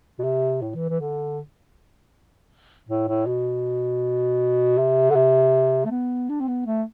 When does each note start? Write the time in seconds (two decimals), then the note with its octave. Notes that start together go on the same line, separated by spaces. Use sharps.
0.19 B2
0.24 C3
0.62 A2
0.75 E3
0.89 E3
1.00 D3
2.89 A2
3.08 A2
3.26 B2
4.78 C3
5.10 D3
5.15 C3
5.85 A3
5.91 B3
6.29 D4
6.40 C4
6.48 B3
6.66 A3